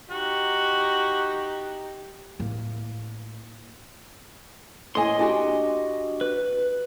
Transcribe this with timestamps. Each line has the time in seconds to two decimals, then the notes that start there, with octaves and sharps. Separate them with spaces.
0.10 D#4 F#4 G4
2.40 A2 A#3
4.95 A2 A#3 D#5 G#5 C6
5.19 D4 F#4 G4
6.21 B4